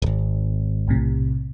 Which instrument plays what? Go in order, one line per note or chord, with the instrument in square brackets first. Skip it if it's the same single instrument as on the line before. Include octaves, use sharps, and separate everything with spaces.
[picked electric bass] D1 G#1
[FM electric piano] B1 A2 C3